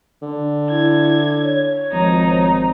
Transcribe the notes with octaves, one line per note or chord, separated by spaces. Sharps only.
D3
E4 G#6
C#5
G#1 F3 D#4